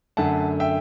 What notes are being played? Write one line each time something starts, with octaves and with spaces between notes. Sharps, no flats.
F#2 D3 A3 F#5 A5
E5 G5